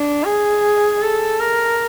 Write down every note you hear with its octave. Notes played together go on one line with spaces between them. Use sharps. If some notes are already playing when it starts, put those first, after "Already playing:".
Already playing: D4
G#4
A4
A#4